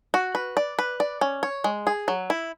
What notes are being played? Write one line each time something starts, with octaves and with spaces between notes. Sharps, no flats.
F#4
B4
D5
B4
D5
C#4
C#5
G#3
G#4
F#3
E4